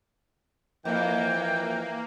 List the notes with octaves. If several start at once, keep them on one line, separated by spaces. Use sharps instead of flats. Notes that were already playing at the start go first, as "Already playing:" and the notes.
F2 E3 A#3 G5